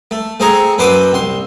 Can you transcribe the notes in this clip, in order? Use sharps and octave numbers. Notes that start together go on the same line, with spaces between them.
A3
A3 C4 G#4 G#5 A#5 C#6
F#2 B4 C5 E5 D6 D#6
C2 C6